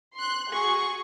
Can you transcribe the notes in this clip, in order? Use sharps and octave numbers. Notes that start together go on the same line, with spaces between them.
C6 F#6
F#4 G#4 C#6